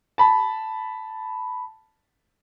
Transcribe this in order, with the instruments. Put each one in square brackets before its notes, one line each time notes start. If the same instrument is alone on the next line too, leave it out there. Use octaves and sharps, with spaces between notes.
[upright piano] A5 B5